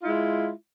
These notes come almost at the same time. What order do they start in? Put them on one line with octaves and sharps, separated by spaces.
F4 E4 G#3